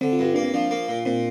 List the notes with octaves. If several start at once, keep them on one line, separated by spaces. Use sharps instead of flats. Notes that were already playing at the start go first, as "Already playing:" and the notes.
D3 C4
F4
G2
F4
A#3 D4
C4
F3 D4
A#3
A#2
A#2 C4